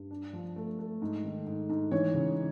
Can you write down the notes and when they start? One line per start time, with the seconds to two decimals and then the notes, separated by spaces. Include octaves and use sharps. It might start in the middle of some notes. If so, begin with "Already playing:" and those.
Already playing: G2
0.11 D4
0.33 F3
0.56 A3
0.79 A3
1.02 G#2
1.24 D#3
1.46 G#2
1.69 G#2
1.91 E3 C#5
2.14 C#3